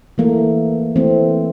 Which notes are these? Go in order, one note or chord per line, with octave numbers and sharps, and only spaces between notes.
E3 A3 A#3
E3 A3 C4